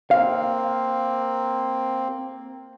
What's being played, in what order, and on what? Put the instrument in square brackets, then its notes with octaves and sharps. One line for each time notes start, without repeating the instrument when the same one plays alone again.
[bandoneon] A#3 C4 [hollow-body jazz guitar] F5